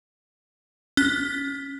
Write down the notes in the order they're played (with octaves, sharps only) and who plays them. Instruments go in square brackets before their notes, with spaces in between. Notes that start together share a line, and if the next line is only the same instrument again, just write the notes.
[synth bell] C#4 F#6